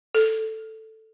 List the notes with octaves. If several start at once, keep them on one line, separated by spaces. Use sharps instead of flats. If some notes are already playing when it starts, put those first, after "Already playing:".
A4